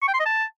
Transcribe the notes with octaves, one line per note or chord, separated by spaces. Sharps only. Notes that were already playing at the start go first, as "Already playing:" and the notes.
C#6
G5
C6
D#5
A5